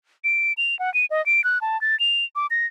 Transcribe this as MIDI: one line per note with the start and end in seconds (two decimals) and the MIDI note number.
0.24 0.53 98
0.58 0.78 101
0.79 0.92 78
0.94 1.06 99
1.10 1.24 75
1.26 1.44 98
1.44 1.61 90
1.61 1.80 81
1.81 1.98 93
2.00 2.25 101
2.36 2.47 86
2.51 2.66 94